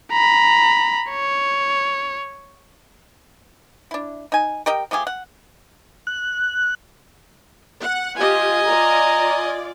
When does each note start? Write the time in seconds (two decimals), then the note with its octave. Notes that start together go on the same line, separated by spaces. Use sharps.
0.12 A#5 B5
1.11 C#5
3.91 D4 E4
4.32 D#4 G#5
4.66 G4 A#4 D#5 G5
4.91 F3 A3 G4 G#4
5.07 F#5
6.07 F#6
7.81 F#5
8.16 F4 G4 D#5 G#5
8.65 F4 D5 A#5